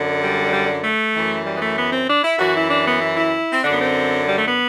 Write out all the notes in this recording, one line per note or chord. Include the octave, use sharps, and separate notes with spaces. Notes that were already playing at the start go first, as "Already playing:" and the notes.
Already playing: F#2 D3
G3
G3
A3
F#2 E3
G3
B3
A3
B3
C4
D4
E4
F#2 E3 F#4
E4
D4
B3
E4
E4
C4
F#2 D3 D4
B3
C4
G3
A3
B3